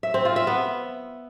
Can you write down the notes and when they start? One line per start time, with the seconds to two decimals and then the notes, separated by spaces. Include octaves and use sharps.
0.03 E5
0.14 C4
0.25 F4
0.36 E5
0.47 B3